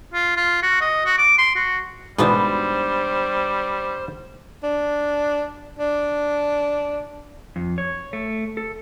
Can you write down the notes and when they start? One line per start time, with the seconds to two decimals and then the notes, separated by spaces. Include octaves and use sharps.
0.14 F4
0.37 F4
0.62 F#4
0.81 D#5
1.06 F#4
1.18 D6
1.38 C6
1.55 F#4
2.18 G#2 B2 E3 G3 B3 D4 C5
4.63 D4
5.79 D4
7.56 F2
7.78 C#5
8.13 A3
8.57 A4